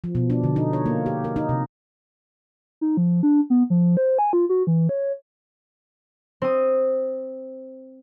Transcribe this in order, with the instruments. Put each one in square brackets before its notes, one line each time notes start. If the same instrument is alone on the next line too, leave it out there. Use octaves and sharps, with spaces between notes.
[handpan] F3
B2
D4
D3
D#4
C#5
A#3
G4
A#4
D#4
C3
[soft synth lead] D#4
F3
D4
B3
F3
C5
G#5
F4
F#4
E3
C#5
[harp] C4 D#6